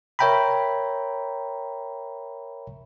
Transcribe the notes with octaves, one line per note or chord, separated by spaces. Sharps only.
A#4 C#5 E5 G5 A#5 B5